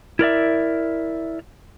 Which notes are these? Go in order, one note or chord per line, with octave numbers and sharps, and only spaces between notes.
E4 A#4 D5 E5